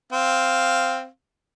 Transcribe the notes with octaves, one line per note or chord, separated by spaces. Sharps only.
C4 F5